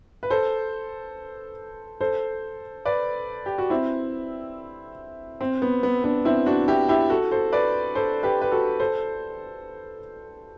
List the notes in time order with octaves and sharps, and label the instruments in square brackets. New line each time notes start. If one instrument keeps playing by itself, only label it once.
[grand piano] B4
A4 C5
A4 C5
B4 D5
G4
F#4
C4 E4
C4
B3
B3
B3 D4
C4 E4
D4 F#4
E4 G4
E4 G4
F#4 A4
A4 C5
B4 D5
A4 C5
G4 B4
B4
F#4 A4
A4 C5